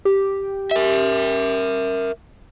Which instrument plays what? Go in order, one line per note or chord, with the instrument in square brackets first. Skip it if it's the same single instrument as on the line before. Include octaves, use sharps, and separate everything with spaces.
[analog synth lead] G4
[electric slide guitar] A#4 E5